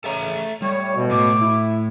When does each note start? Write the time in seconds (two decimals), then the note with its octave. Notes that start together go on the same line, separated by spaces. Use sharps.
0.04 C#3 A4 E5 A#5
0.62 A2 G3 C#5
0.96 B2
1.11 A2 D6
1.41 E4